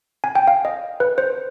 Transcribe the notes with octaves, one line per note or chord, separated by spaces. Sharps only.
G#5
G5
F5
D#5
B4
C5